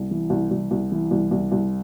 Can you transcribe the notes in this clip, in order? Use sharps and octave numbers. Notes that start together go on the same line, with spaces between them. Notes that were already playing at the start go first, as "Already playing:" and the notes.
Already playing: C2
E3
C2
C2
C2
E3
C2
C2
C2